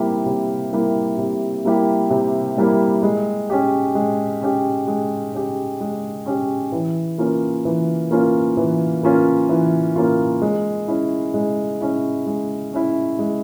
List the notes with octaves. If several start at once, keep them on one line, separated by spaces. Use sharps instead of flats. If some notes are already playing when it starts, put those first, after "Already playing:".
Already playing: C3 G3 A#3 E4 G4
C3
G3 A#3 E4 G4
C3
G3 A#3 E4 G4
C3
G3 A#3 E4 G4
G#3
C#4 G4
G#3
C#4 G4
G#3
C#4 G4
G#3
C#4 G4
E3
A#3 C#4 F4
E3
A#3 C#4 F4
E3
A#3 C#4 F4
E3
A#3 C#4 F4
G#3
C#4 E4
G#3
C#4 E4
G#3
C#4 E4
G#3